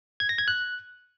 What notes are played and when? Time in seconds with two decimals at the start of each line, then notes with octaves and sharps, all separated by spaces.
0.20 G#6
0.29 A#6
0.38 G#6
0.48 F#6